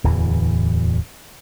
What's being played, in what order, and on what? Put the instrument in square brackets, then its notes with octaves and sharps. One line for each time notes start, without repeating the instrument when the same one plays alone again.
[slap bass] D1 E2 E3